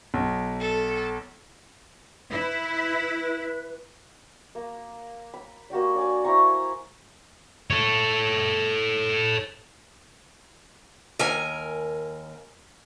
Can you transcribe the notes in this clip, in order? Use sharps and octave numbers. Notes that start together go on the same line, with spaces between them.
B1
A4
E4 B4
A#3
B5
A#3 F#4 G4 D5
D4 D5 G#5
E4 C5 A#5 C#6
A4 C#5
D#2 A#4 G#5